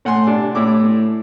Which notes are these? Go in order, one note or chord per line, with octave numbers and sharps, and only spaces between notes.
A2 F#5 G#5 C6
C3 D4
A2 E4 D6